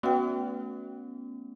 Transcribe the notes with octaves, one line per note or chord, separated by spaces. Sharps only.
A3 B3 C#4 F#4 B4 G5